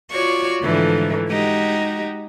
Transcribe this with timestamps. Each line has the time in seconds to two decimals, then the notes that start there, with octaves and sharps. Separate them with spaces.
0.11 F4 F#4 C#5 D5 C#6
0.61 G#2 D3 E3 F3 A3
1.29 G#3 D#4 F#4 G4